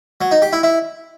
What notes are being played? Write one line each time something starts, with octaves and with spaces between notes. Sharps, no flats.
F#3
D#4
G4
E4
E4